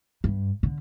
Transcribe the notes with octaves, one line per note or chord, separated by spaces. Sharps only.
G2
D3